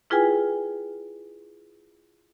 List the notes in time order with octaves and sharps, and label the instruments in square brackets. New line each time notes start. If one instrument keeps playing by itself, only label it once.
[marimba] E4 F4 G#4 B4 G5 G#5